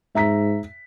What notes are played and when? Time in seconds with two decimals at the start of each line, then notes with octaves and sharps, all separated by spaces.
0.15 G#2 E5 A#5 B6